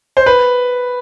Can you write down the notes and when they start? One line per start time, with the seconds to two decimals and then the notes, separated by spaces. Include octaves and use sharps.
0.17 C5
0.26 B4